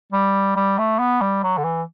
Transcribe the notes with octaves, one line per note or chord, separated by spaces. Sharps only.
G3
G3
A3
B3
G3
F#3
D3
E3